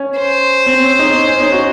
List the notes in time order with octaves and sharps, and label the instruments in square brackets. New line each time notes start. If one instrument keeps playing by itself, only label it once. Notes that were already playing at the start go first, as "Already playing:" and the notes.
Already playing: [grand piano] C#4
[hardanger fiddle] C5
[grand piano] C4
C#4
D#4
C#4
C#4
D#4
F#4